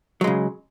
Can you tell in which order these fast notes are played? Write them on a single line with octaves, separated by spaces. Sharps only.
F#3 G#3 C#3